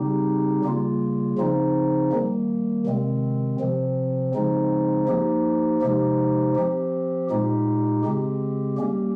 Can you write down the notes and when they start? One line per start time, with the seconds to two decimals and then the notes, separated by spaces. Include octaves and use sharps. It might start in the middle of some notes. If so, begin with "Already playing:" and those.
Already playing: C#3 G3 C4 D#4 G4
0.64 C#3 G3 A#3 F4
1.38 C#3 F3 C4 D#4
2.12 D#3 G3 A#3
2.86 C3 D#3 G#3 C4
3.60 C3 F3 C4
4.34 C#3 F3 G#3 C4 D#4
5.08 F3 A#3 D#4 G4
5.82 C3 F3 G#3 D#4 G4
6.56 F3 C4 G4
7.30 A#2 G#3 D#4 G4
8.04 C#3 G#3 C4 G4
8.78 G3 A#3 C#4 G4